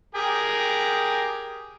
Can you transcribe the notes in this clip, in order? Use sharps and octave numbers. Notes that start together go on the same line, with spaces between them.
G4 G#4 A#4